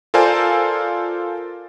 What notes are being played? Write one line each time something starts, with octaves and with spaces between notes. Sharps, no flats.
F4 A4 A#4 C5 D5 G#5